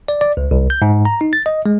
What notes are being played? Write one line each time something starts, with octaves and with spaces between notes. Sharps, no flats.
D5
D5
C#2
C2
G6
G#2
A#5
D#4
A6
D#5
G#3